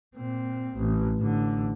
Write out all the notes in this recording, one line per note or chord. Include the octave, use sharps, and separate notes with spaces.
A#2 C4
A1
A1 D3